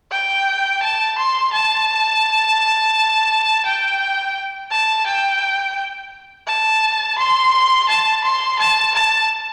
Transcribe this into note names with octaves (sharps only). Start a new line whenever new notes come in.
G5
A5
C6
A5
G5
A5
G5
A5
C6
A5
C6
A5
A5